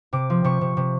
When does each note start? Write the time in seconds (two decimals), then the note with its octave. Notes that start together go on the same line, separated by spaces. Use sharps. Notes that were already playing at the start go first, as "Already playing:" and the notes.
0.13 C3 D6
0.30 F3
0.44 C3 C#6
0.61 C3
0.77 C3